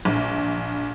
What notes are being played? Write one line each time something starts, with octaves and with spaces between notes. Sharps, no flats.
A#1